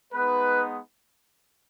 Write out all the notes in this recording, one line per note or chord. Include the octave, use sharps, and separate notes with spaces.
G#3 B3 D#4 B4